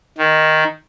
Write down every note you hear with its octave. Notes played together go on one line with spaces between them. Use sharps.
D#3